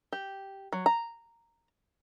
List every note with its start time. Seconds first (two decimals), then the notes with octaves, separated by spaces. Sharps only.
0.13 G4
0.73 F#3
0.86 A#5